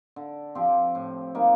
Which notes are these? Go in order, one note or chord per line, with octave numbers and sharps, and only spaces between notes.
D3
F3 C4 G4
A2
G3 A#3 D#4